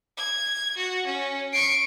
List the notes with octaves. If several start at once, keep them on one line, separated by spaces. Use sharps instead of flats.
G#6
F#4
C#4
C#6 C7 D7